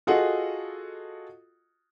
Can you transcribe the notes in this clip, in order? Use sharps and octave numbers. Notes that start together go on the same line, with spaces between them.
F4 F#4 G#4 A4 D#5 F#5